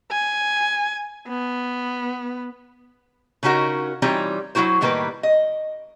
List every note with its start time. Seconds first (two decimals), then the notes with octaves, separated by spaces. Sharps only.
0.11 G#5
1.28 B3
3.43 C#3 C#4 D#4 F#4 A#4
4.02 E3 G3 C4 D#4 F4 C#5
4.55 F#3 C4 E4 F#4 C5
4.81 A2 D#3 G3 A#3 B4
5.23 D#5